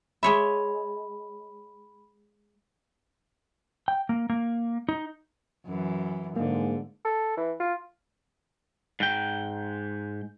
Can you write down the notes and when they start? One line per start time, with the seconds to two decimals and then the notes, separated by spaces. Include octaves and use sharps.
0.23 G#3 C#5 E5 B5
3.88 G5
4.09 A#3
4.30 A#3
4.89 D#4
5.66 F#2 E3
6.36 G#2 D3 A#3
7.05 A4
7.37 E3
7.60 F4
9.00 G#2 G5